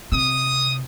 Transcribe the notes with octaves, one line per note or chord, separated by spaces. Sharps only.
C3 D#6